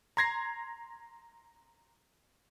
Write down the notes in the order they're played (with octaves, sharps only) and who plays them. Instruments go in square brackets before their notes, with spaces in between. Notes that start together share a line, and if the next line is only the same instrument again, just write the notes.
[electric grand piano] A#5 C6 G#6 A#6 C7